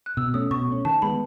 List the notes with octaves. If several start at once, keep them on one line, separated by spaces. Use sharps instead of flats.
F#6
B2 E6
A3 C#4 D#6
B2 C#6
A3 C#4
D#3 A5
G#3 B3 B5